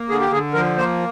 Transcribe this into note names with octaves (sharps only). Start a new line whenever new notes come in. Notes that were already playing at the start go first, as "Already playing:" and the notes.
Already playing: A#3
D3 G#4
G4
D3 G#4
F3 A#4
A#3 C5